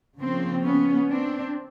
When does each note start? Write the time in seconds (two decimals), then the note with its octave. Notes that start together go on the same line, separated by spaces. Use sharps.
0.19 C#3 F3 A#3 C4
0.64 B3 C#4
1.10 C4 D4